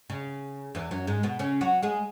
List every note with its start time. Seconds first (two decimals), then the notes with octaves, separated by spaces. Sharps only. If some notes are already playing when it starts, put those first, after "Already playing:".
0.10 C#3
0.75 E2 E3
0.91 F#2 F#3
1.07 G#2 G#3
1.23 B2 B3
1.39 C#3 C#4
1.61 F#3 F#4
1.83 G#3 G#4